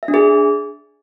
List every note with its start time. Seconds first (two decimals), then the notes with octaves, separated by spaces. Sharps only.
0.03 E5
0.08 D4
0.14 G#4